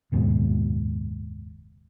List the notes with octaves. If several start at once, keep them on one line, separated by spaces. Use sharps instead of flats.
F#1 D#2 G#2 B2